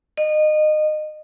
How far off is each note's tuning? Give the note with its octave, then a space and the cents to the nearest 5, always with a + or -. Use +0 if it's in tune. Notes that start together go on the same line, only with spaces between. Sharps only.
D#5 -25